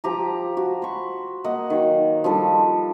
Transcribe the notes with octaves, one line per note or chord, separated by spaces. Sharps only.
F3 G4 A#5
F#4
C5 B5 C#6
A#3 D#5 F#5
D#3 F#3
F3 G3 D4 A4